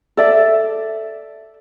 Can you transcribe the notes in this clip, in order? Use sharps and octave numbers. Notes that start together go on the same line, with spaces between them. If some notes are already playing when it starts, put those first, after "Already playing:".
A4 D5 E5